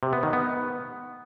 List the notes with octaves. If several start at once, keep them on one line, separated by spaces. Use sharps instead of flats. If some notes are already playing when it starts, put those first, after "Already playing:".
C3
B3
D#3
B3